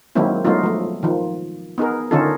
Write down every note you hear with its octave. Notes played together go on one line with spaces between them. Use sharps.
D#3 F#3 G#3 A#3 C4 E4
F#3 G#3 A3 B3 D#4 F4
F3 A3
D#3 F3
B3 D#4 G#4 A#4
D3 D#3 C#4 D#4 F4 A4